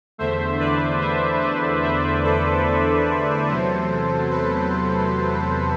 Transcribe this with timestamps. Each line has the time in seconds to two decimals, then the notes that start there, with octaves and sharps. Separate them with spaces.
0.18 E2 D3 A3 C5 E5
0.59 B4 D5
1.01 C5 E5
1.42 C5 E5
1.83 C5 E5
2.23 A4 C5
3.47 E2 C3 F#3 A3
4.30 B4